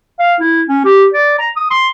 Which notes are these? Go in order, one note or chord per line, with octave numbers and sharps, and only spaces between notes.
F5
E4
C#4
G4
D5
A#5
D#6
C6